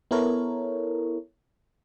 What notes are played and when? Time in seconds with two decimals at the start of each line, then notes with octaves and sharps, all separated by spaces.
0.11 B3 E4 A4 A#4 C#5